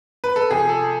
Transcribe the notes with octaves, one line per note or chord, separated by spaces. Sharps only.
B4
A4
C3 F3 G#4
A4